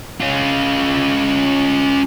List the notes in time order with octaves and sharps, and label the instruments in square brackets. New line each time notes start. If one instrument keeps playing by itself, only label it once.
[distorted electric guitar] C#4 F4